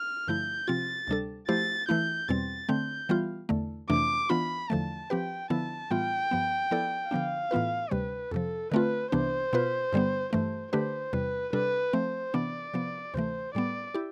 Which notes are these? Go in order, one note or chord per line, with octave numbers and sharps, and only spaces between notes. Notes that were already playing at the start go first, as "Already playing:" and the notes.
Already playing: F6
G2 D3 F3 A3 E4 G6
C3 F3 C4 F4 A6
D2 C3 G3 D4 A4
F3 A3 E4 G4 C5 A6
E3 A3 E4 G6
E2 B2 G3 C4 A6
D3 A3 C4 G6
E3 G3 B3 F4
E2 D3 A3
F2 C3 E3 A3 D4 D6
E3 B3 D4 F4 B5
E2 D3 F3 A3 A5
F3 C4 G4 B4 G5
D3 F3 B3 E4 A5
A2 E3 G3 B3 F4 G5
G2 F3 B3
F3 B3 E4 A4 D5
D3 F3 B3 D4 F5
A2 E3 B3 F4 B4
D2 C3 G3 B4
F2 C3 F3 A4
D3 A3 C4 F4 B4
C2 C3 E3 B3 D4 C5
B2 B3 F4 B4
G2 D3 G3 B3
G2 E3 A3 C5
D3 A3 D4 G4 B4 C5
E2 C3 G3 B4
C3 G3 D4 A4 B4
F3 A3 C4 C5
C3 E3 B3 D4 D5
C3 F3 B3
D2 C3 E3 A3 C5
A2 G3 B3 D5
E4 G4